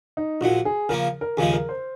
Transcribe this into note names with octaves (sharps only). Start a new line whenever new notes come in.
D#4
A#1 A#2 F#3 F#4
G#4
C#3 F3 A#3 A#4
A#4
D#2 C#3 F3 G#3 G#4
A#4
C5